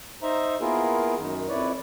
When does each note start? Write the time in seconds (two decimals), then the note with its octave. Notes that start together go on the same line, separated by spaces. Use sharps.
0.23 D#4 C5 E5 A#5
0.61 A#3 B3 E4 F4 G#4 A#4
1.17 F#2 D#3
1.49 F2 E4 B4 C#5 D5